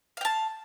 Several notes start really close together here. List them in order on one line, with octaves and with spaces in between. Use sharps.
F5 G5 A5